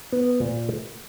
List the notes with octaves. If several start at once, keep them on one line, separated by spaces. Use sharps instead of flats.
B3
A#2